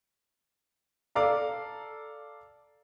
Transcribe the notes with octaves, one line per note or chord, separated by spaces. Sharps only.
A4 D5 F5 A#5